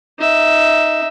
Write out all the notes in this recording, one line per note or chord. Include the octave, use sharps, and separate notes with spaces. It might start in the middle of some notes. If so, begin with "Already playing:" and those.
D#4 E5